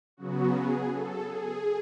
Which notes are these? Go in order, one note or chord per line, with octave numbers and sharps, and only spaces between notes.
C#3 F#3 B3 F#4
G#4
A4
G#4